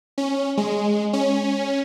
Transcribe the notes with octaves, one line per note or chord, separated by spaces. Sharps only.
C#4
G#3
C#4